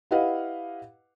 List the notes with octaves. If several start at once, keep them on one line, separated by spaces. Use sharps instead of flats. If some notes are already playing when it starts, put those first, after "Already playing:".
E4 G4 B4 D#5 F5 F#5